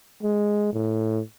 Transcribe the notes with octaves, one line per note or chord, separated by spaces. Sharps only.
G#3
A2